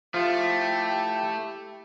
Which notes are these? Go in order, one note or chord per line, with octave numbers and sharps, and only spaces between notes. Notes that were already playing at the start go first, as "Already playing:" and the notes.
F3 A3 E4 F4 G4